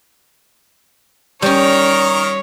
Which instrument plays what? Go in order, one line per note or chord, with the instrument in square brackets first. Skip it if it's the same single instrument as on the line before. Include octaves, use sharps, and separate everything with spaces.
[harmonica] D#3 A#4 [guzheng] G3 C#4 [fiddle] C#5